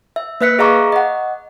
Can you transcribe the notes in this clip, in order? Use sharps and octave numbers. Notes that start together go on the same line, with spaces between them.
E5
A#3 B4 E5 F#6 B6 C#7
G#4 D#5 F5 A#5 C#6 D6
D#5 F#5